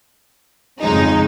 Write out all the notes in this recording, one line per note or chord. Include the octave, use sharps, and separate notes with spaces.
F2 C#3 G#3 D#4